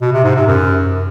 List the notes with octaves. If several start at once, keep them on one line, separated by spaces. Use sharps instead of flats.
B2
C3
G#2
C3
F#2